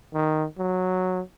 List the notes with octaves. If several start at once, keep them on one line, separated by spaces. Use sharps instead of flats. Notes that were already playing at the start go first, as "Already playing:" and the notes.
D#3
F#3